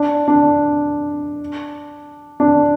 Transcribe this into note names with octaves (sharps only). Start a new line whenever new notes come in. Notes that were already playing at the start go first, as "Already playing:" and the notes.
Already playing: D4
D4
D4